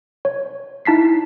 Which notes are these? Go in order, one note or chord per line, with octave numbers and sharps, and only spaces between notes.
C#5
D#4 E4 A5 B6 C7